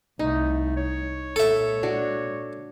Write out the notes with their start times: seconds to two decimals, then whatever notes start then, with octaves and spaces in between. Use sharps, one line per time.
0.19 C2 A3 D#4
0.77 C#5
1.36 A#2 G#3 A4 E5
1.83 D4 F#4